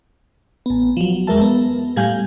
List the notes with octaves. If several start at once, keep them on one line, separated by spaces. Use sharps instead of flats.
A1 B3
F3 F#3
E2 G#3 A#4 E5 A5
B3
A2 G3 F5 G#5 G6